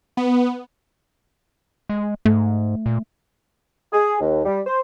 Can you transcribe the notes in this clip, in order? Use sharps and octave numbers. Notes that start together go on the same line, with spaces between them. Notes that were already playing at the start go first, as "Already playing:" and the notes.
B3
G#3
G#2 A3
A#2
G#4
D#2
G3
C5